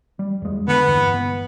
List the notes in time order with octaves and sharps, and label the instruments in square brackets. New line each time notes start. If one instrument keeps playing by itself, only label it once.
[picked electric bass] G3
E2 G#3
[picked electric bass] D3 [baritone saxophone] B3
[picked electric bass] G1 E2